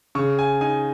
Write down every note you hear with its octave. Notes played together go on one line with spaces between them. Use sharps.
C#3 C#6
G#5
D#4 G#5